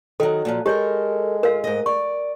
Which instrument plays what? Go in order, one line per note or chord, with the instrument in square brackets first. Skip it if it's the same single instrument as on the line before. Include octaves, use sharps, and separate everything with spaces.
[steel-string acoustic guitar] D#3 F#3 [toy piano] A4
[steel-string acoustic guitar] A#2 F3 F#3
[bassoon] G#3 [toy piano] G4 C#5 [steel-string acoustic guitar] A4 A#4
[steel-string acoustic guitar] F4 [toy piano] A#4 F5
[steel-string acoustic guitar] G#2 D#5
[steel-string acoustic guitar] D5 [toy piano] C#6